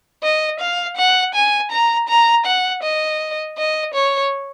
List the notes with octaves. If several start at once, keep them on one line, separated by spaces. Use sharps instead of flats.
D#5
F5
F#5
G#5
A#5
A#5
F#5
D#5
D#5
C#5